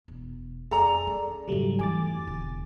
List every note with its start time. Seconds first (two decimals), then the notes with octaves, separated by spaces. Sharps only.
0.08 E1
0.71 F2 G#4 A4 D5 A#5
1.07 C#4
1.48 G#2 C#3 F#3 G3 A3
1.79 F2 E3 G#5 D6 A6
2.27 E1 D3